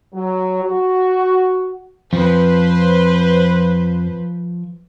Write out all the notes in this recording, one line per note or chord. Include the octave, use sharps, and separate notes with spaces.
F#3
F#4
F2 F3 B4 C5